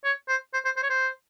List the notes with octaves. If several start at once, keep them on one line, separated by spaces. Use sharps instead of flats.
C#5
C5
C5
C5
C5
C#5
C5